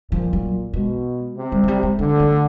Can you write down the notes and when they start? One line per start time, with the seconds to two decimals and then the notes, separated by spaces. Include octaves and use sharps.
0.11 A#2 F3
0.33 F#3
0.73 B2 G#3
1.37 C3
1.52 G3
1.63 F#3
1.68 G3
1.83 G#3
1.99 D3 A3
2.19 A3